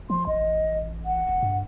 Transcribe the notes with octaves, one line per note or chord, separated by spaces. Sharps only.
F3 C6
A1 D#5
F#5
F#1
G2